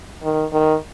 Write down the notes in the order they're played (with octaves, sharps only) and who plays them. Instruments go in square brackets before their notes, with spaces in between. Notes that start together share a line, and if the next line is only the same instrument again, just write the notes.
[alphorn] D#3
D#3